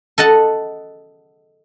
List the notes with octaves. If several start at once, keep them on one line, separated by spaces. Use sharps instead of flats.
A4 D#5 F#5 A5